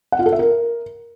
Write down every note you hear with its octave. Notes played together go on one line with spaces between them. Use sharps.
F#5
F4
A4
E5
A#4